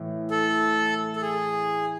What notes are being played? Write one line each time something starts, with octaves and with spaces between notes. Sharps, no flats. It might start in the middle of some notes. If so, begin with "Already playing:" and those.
Already playing: A2 E3
A4
A4
G#4